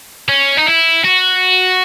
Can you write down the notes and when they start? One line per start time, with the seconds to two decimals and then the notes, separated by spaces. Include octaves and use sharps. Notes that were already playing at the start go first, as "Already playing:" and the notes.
0.29 C#4
0.57 D#4
0.67 E4
1.04 F#4